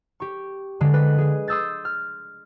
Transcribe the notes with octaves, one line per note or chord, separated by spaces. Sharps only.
G4 C#6
D3 G#3
B4
G#3 G#4
C6 D#6 E6 G6 A6
F6